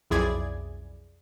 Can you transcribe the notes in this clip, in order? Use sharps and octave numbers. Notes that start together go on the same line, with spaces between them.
B1 F2 E4 G#4 D5 G#6